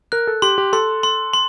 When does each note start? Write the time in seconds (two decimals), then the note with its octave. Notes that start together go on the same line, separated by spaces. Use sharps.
0.12 A#4 F#6
0.27 A4
0.42 G4 C6
0.58 G4
0.73 A4 C6
1.03 C6
1.34 C6